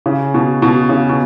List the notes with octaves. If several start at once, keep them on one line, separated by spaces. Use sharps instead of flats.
C#3
B2
B2
C#3
B2